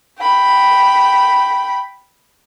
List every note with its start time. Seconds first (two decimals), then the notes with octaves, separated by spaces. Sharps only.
0.20 G5 B5